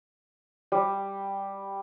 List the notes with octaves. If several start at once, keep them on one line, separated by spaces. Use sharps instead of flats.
G3